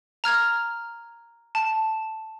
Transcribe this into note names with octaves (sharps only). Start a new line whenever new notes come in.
A#5 F6 G#6 F7
A5